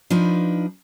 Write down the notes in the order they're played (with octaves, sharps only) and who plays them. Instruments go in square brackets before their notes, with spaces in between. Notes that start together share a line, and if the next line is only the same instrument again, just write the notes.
[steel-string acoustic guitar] F3 D4 D#4 B4